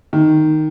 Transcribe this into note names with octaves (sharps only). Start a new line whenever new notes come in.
D#3